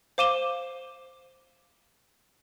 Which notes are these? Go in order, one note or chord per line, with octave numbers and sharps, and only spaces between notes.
C5 F5 D6 D#7 E7 G7